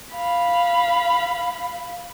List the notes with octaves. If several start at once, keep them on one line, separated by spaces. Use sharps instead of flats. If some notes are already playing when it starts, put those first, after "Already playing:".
F5 B5